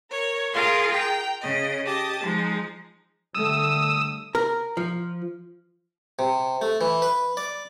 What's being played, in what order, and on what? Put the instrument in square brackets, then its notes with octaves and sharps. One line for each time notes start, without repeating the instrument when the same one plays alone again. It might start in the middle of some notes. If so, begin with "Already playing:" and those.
[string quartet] A#4 C#5
F4 G#4 A#4 F5 C6
G5 A#5
C#3 D#5
G4 D#5 A5
F3 G#3 D#4
[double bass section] D3 G3 A3 [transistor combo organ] D#6 E6
[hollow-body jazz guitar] A#4
F3
[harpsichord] C3
A3
E3
B4
D5